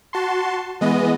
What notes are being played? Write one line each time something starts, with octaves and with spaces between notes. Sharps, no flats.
F#4 A5 C6
E3 G#3 B3 D#5